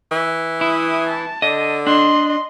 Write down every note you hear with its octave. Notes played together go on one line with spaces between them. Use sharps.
E3
E4 D#6
A5
D3 D#5
D4 D#5 C6